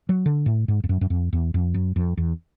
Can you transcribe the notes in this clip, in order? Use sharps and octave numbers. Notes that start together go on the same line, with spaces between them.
F#3
D3
A2
G#2
F2
F#2
F#2
F2
E2
F2
F#2
F2
E2